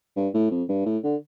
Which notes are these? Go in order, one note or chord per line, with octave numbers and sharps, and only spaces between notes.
G2
A2
F2
G2
A2
D3